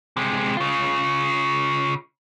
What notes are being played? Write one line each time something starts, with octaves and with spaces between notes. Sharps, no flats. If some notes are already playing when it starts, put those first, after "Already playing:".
C3 G#3
C#3 F4